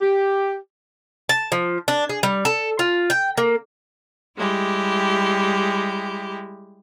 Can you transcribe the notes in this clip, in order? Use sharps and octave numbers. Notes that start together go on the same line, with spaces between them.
G4
A5
F3
D4
G#4
G3
A4
F4
G5
A#3
G3 G#3 E4 G4